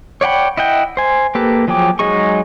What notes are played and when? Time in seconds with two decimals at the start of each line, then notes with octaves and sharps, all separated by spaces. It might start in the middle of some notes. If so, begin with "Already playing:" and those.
0.21 C#5 D5 F#5 G5 B5
0.57 E4 D#5 F#5 G5
0.97 C5 G#5
1.35 A#3 G4 A4 B4
1.68 F3 F#3 G#4 G5 D6
1.99 F#3 G#3 D#4 G#4 C#6